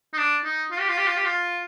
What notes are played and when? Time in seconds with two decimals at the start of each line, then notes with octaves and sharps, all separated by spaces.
0.14 D#4
0.18 D4
0.45 D#4
0.71 F4
0.80 G4
0.89 F4
0.98 G4
1.07 F4
1.16 G4
1.25 F4